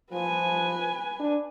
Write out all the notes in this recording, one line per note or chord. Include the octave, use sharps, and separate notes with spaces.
F3 B4 G#5
D4